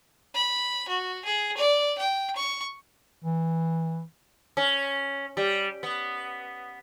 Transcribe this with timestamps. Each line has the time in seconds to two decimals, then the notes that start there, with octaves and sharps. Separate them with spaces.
0.34 B5
0.88 F#4
1.25 G#4
1.57 D5
1.98 G5
2.36 C#6
3.25 E3
4.57 C#4
5.37 G3
5.83 B3